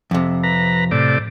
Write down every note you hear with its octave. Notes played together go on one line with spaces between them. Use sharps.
F2 C3
B4 A#5
A2 C3 D5